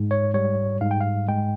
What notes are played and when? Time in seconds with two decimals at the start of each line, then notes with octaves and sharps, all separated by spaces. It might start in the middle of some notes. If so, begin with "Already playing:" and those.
Already playing: G#2 G#3
0.11 C#5
0.34 G3 C#5
0.81 G#2 F5
0.91 G5
1.01 F5
1.28 G#3 G5